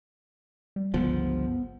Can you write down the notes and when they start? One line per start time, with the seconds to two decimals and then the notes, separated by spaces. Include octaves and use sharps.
0.76 G3
0.94 G1 C#2 F3 B3